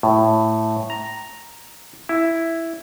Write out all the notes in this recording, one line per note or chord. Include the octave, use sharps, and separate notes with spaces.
A2
A#5
E4